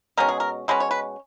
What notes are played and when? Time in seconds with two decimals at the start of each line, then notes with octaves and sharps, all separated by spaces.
0.17 B2 G#3 C#4 A#4
0.29 G#4
0.40 A#4
0.68 B2 G#3 C#4 B4
0.80 C#5
0.91 B4